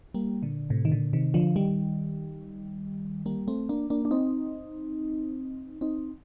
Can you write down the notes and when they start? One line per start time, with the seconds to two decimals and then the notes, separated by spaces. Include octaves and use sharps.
0.14 G3 A#3
0.43 A#2 D3
0.70 A2 C3
0.85 D#3
0.92 A#2 D3
1.13 C3 D#3
1.34 D3 F3
1.56 D#3 G3
3.26 G3 A#3
3.48 A3 C4
3.69 A#3 D4
3.90 A#3 D4
4.05 D4
4.11 C4 D#4
5.81 C4 D#4